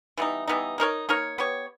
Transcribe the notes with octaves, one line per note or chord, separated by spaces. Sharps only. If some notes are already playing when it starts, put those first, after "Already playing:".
E3 G3 B3 D#4
E3 G3 B3 D#4
A#3 D#4 A#4 C#5
A#3 D#4 A#4 C#5
B3 G4 C#5